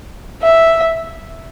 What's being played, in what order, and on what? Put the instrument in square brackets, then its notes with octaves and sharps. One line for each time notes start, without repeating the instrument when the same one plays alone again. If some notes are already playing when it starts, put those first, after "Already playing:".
[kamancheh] E5